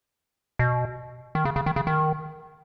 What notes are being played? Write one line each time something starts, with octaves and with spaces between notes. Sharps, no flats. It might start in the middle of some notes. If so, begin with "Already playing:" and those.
B2
D#3
C#3
C#3
D#3
C#3
D#3